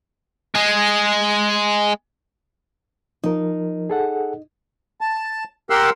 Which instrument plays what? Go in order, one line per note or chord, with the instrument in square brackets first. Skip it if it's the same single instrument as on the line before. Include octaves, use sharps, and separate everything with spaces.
[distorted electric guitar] G#3 G#4
[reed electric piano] F3 A#4 [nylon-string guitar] D#4
[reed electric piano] G#4 A4 F#5
[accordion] A5
G4 A#4 F#5 C6 E6